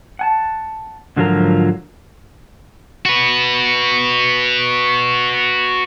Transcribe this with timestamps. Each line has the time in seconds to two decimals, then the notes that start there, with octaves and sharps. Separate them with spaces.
0.19 F#5 G#5 A5
1.16 G#2 D3 F3 F#3 F4 A#4
3.05 F#4 B4